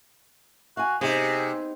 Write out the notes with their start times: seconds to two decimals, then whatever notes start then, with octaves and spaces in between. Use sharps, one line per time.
0.77 F#4 F5 G#5
1.01 C3 B3 D#4 G#4